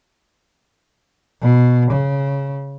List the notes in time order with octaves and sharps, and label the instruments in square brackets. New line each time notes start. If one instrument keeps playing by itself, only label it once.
[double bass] B2
C#3